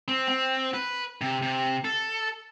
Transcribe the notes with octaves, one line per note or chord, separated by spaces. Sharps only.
C4
C4
B4
C3
C3
A4